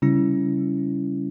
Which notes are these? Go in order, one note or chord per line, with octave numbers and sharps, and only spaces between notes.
C#3 G3 C#4 E4